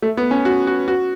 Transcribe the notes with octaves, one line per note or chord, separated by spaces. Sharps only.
A3
B3
C#4
F#4
F#4
F#4